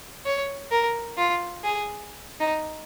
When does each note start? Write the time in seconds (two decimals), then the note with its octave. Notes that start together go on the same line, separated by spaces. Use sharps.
0.26 C#5
0.71 A#4
1.18 F4
1.64 G#4
2.40 D#4